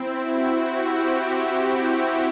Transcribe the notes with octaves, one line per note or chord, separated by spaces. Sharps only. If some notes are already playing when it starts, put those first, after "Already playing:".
Already playing: C4 E4
F#4
G4